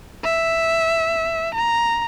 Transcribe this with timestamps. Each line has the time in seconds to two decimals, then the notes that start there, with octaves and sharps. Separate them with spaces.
0.24 E5
1.55 A#5